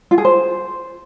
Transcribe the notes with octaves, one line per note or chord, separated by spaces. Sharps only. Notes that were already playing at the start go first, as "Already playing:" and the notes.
F4
G#4
C5